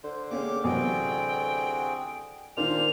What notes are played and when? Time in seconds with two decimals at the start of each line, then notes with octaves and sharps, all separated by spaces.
0.04 D3 C5
0.31 A#3 C#4 G4 G#4 D6
0.64 A1 C3 F#3 C4 F#4 G#4 G5
2.57 A#2 D#3 D4 C5 F5 F7